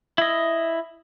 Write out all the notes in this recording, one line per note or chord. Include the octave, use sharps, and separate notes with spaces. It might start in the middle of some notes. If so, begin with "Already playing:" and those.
E4 D#5